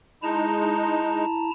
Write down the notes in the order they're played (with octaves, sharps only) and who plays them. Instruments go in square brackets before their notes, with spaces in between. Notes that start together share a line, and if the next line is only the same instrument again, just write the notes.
[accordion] G#3 D#4 [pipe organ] E4 A5 A#5